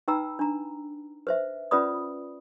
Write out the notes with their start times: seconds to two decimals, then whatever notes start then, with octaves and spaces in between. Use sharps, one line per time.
0.08 D#4 B4 G5 A#5 B5 E6
0.39 D4 A#5
1.27 B4 C5 E5
1.71 C#4 F4 B4 D5 B5 D#6